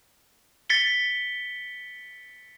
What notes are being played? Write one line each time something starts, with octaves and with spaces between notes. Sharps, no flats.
A6 B6 C#7 G7